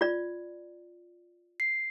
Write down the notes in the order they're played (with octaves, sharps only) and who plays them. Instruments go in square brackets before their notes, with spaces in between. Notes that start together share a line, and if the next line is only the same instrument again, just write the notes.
[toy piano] F4 D5
[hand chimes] C7